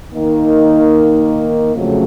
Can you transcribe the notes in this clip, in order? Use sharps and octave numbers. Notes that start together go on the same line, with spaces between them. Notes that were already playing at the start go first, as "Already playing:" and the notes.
D#3 A#3 D#4
F2 C#3 F#3 A3